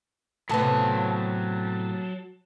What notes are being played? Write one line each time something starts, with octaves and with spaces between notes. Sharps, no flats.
A2 C3 F#3 B3 A5